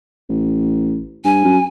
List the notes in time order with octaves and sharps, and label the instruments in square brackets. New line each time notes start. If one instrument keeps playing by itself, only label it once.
[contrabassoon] A1
[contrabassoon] G2 [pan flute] G#5
[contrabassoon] F#2